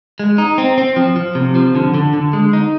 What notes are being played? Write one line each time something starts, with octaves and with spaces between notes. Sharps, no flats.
G#3
D#4
C4
C4
F3
F3
C3
F3
D3
D3
D3
G#3
D#4